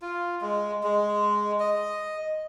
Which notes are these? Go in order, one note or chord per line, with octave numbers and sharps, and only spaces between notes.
F4
G#3
G#3
D#5